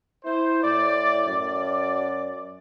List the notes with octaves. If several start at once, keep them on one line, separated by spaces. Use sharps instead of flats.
E4 C5
A2 D5
F#2 D5